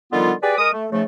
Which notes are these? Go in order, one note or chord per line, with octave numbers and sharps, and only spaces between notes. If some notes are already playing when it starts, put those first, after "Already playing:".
D3 D#3 F3 G3 B3 F4
G4 G#4 B4 D5
G#3 A#4 D#6
A3
G#2 C#3 F3 A3